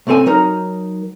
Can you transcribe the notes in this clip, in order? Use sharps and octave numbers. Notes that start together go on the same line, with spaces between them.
C2 A2 C4 A4 G#5
F#3 D#4 A#4